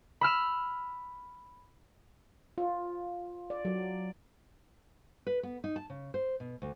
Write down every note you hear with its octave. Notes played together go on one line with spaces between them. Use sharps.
B5 E6 F6 E7
F4
D5
F#3
B4
B3
D#4
A5
C#3
C5
B2
D2